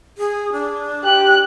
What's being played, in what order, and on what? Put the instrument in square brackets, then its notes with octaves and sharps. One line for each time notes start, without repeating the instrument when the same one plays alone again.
[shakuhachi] G#4
D4
[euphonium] G4 [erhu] F#6